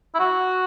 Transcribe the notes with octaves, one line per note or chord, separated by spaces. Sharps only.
E4
F#4